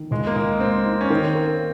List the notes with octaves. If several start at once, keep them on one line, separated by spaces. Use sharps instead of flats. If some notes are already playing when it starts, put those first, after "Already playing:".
Already playing: D#3
C#2 G#3
A#3
C#2 G#3
G#3 C4
D#4
C#4
D#3 C4
A#3